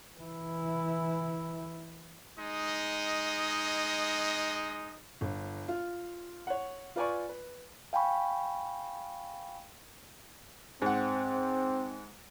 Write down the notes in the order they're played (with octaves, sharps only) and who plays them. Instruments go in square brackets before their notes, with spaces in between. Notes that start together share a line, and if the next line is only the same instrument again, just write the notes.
[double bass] E3 E4
[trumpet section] G#3 D#4 D#5
[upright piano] G1
F4
C#5 F#5
F4 B4 D5 G#5 C#6
B4
[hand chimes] F5 G5 G#5 B5 C#6
[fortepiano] G#2 F#5 [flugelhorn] C4